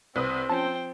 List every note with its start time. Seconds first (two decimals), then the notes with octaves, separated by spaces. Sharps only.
0.16 C2 C4 B4 D#6
0.50 F3 C#4 C5 G5 A5